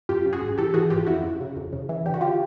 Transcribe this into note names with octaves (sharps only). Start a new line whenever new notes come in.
F#2 F4 G4
C#3
F#4 G#4
G#1
E3 G4 A4
E3 F#4 G#4
G#1 F4 G4
F2 E4 F#4
C#3
C#3
F2
C#3
E3
D3 G4
F#4
F4 G4